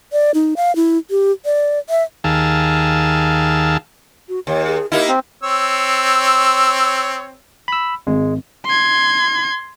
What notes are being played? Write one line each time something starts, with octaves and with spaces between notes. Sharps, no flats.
D5
D#4
F5
E4
G4
D5
E5
D#2 D#3 G#4 F5 A5 E6
F#4
D#2 C#5
G#4
A#3 D#4 E4 G4
C4
C4 C#5 E6
B5 E6
G#1 G#3
C6 G#6